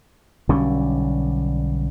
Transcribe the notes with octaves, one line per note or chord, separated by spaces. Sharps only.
B1 D3 G3 C#4